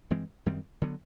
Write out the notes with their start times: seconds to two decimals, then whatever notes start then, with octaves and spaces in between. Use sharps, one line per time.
0.11 G2 E3 G#3 C4
0.46 F#2 D#3 G3 C4
0.82 D3 F#3 B3